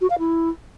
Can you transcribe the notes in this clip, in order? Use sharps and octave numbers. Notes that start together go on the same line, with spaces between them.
F#4
F5
E4